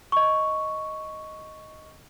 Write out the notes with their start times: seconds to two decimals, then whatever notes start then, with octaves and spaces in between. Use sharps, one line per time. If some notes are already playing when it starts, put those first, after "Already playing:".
0.12 D#5 C#6